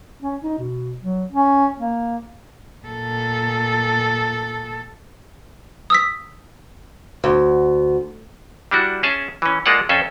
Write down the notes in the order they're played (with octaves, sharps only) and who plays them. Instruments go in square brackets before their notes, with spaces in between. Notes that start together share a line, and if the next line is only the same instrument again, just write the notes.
[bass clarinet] C#4
D#4
B2
F#3
C#4
A#3
[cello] A#2 A4
[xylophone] D#6 E6 B6
[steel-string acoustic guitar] D2
[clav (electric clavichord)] G3 D4 E4 F#4
C#4 G#4 E5 A5
E3 C#4
G#3 A#3 F4 A4 D5 F#5
F2 C#4 A4 C5